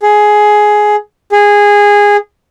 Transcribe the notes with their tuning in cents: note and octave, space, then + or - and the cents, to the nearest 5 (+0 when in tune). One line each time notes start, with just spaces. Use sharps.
G#4 +10
G#4 -15